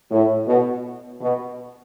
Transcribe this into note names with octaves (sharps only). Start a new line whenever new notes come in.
A2
B2
B2